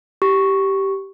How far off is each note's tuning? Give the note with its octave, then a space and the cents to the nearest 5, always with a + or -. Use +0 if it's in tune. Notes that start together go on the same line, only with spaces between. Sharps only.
G4 -10 C#6 +0